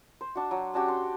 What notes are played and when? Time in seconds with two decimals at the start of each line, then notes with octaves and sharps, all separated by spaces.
0.21 C5
0.35 D4 F#4
0.51 F#3
0.74 C#4 D4 F#4 G4
0.88 C6